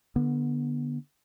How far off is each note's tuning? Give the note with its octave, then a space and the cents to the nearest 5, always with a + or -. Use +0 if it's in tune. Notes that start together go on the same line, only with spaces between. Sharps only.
D3 +5 B3 -25